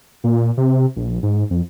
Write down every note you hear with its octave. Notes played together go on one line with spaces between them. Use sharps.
A#2
C3
A#1
G#2
F2